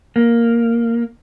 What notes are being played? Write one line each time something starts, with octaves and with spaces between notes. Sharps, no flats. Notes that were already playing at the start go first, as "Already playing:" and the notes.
A#3